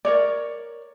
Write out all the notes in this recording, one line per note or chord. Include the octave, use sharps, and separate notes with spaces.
A#4 C#5 D5